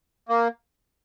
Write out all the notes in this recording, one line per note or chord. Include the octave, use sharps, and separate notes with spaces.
A#3